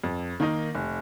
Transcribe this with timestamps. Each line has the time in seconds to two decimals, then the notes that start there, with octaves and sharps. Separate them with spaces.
0.04 F2
0.40 D#3 A#3 D#4
0.75 F1